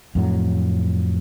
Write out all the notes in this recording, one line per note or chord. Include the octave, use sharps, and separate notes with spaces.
F2 A2 F#3